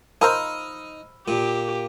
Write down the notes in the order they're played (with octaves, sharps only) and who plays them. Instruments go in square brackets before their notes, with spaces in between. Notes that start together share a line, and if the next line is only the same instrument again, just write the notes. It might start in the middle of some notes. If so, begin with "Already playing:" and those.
[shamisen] F3 A#4 C5 [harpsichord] D#4 [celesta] B5 E6 F6
[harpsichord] A#2 [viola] G4